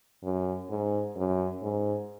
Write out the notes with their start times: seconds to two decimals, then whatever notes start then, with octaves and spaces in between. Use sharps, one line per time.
0.23 F#2
0.70 G#2
1.16 F#2
1.62 G#2